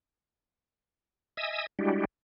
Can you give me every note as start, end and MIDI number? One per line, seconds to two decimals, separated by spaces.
1.37 1.66 75
1.37 1.66 76
1.37 1.66 80
1.37 1.66 87
1.37 1.66 88
1.79 2.05 55
1.79 2.05 56
1.79 2.05 62
1.79 2.05 64
1.79 2.05 66
1.79 2.05 67